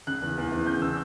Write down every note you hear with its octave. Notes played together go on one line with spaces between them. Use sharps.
C#3 F#6
E2
E2
E2
C#3 G6
C#3 E6